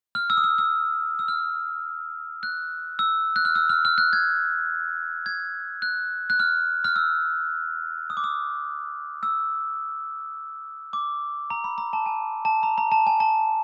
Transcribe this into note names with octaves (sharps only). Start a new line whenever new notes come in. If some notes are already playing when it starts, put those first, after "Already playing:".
F6
E6
D#6
E6
E6
E6
F6
F#6
E6
F#6
F6
E6
F6
F6
F#6
G#6
G#6
F#6
F#6
F6
F6
E6
D#6
D6
D#6
E6
D6
A#5
B5
A#5
A5
G#5
A5
A#5
A#5
A5
G#5
A5